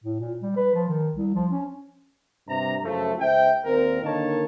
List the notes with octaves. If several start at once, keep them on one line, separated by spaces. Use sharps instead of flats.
A2
A#2
G3
B4
F3
D#3
C2
F3
C#4
G2 C3 A#5
F#2 C#3 F3 A3
C#2 C5 E5 G5
D#2 A#2 C4 A#4
D3 D#3 A#3 D#4 C#5 A5